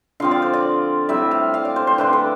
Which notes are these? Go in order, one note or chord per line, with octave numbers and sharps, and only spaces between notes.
D3 F3 C4 F5
D5
C5
D5
A2 G3 C4 E5
F5
F5
D5
C5
C5
D3 A3 D4 B4
A4